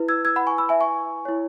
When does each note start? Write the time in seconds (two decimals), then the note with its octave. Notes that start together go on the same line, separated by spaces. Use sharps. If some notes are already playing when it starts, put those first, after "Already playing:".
Already playing: E4 B4
0.09 E6 G#6
0.25 E6 G#6
0.36 F#5 B5
0.47 G#5 C#6
0.58 B5 E6
0.69 E5 G#5
0.80 G#5 C#6
1.25 E4 C#5